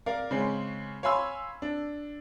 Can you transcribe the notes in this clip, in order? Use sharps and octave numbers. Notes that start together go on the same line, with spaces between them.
A#4 D5 F5
C#3 G#3 C4 C#4
C#5 F5 G#5 B5 C6 E6
D4